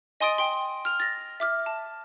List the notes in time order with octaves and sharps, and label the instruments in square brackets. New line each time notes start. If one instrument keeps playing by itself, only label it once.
[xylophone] D#5 G#5 C6 D#6 A6 D7
G5 C6
F6 F7
A6 A#6
E5 D6 F6
A5